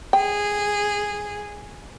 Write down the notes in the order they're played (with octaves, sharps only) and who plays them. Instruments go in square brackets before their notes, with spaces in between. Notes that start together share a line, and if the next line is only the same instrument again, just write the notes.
[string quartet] G#4 [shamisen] G5